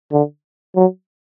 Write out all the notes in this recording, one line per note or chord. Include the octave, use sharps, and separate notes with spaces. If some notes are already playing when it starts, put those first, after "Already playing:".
D3
F#3